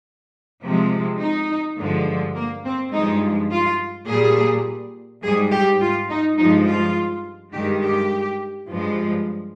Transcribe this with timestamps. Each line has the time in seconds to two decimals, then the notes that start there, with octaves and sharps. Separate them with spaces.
0.62 C3 F3 G#3
1.20 D#4
1.77 G2 D3 F3 G#3
2.36 A#3
2.64 C4
2.92 G2 F3 G#3 D#4
3.51 F4
4.08 A#2 G3 G#4
5.23 G#2 G3 G#4
5.52 G4
5.81 F4
6.10 D#4
6.38 G2 F3 G#3 D#4
6.67 F4
7.53 G2 D#3 G#3 G4
7.82 G4
8.68 G2 F3 G#3